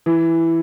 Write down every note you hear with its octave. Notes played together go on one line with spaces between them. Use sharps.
E3